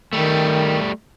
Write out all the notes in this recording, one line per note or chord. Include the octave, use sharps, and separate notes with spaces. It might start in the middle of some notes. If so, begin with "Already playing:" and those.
D#3 G3 A3